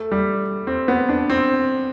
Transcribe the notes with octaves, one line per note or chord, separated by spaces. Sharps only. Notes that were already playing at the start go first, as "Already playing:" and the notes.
Already playing: A3
G3
C4
B3
D4
C4